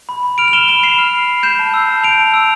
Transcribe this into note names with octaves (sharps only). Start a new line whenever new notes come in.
B5
B5
F6 D7 F7
F7
F6 E7 G7
B5 E7 G7
B5 C7 E7
F6
F6
B5
G6 C7 E7
A5
E6
A5
G6 D7 F7
A5
E6